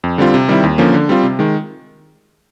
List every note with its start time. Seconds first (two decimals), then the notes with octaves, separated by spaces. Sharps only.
0.04 F2
0.18 D3 G3 C4 F4
0.34 C3
0.48 D#3 G3 C4 E4
0.63 D#2
0.78 D3 F3 A#3 C#4
0.94 D3
1.09 G3 C4 F4
1.23 C3
1.39 D#3 G#3